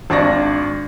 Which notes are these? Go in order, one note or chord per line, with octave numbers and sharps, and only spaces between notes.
G#1 D4 D5 C#6 A#6